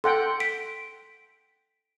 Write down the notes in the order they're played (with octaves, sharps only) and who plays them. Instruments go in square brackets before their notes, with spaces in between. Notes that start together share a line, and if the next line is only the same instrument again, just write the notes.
[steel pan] A4 F#5 G5 [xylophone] C6
[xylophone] B6 D7